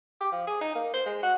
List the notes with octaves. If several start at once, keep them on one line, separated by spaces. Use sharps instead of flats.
G4
F3
G#4
D#4
A#3
C5
G#3
F#4